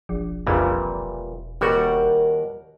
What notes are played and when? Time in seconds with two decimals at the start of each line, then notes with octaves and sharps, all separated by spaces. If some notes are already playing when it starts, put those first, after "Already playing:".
0.09 E1 A#1
0.47 A#1 F2 A#2 C#3 E3 G3
1.61 D#2 G3 F#4 A#4 F#5